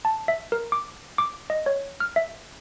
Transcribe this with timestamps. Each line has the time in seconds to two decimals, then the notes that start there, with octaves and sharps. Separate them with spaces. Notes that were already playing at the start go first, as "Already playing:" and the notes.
0.05 A5
0.28 E5
0.52 A#4
0.72 D6
1.18 D6
1.50 D#5
1.66 C#5
2.00 F6
2.16 E5